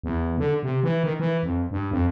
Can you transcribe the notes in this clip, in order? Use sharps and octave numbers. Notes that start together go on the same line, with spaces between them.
E2
D3
C3
E3
D#3
E3
F2
G2
F2